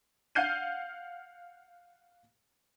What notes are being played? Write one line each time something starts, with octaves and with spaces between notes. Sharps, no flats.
F5 F#5 F6 G6 C7 D#7